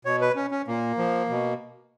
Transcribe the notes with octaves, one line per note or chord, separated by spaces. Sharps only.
B2 C#5
B4
C#4
C#4
A#2 A#3
F3
B2